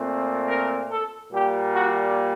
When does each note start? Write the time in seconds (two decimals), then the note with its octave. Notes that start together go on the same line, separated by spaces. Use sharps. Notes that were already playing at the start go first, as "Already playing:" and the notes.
Already playing: A#2 A3 C4
0.47 A#4
0.89 A4
1.31 A#2 G3 A#3 G4
1.74 F#4